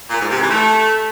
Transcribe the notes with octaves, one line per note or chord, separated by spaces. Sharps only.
A#2
G#2
C3
E3
A3